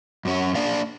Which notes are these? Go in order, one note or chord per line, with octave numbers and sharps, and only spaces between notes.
F#2 C#4
A#3 D4 D5 F5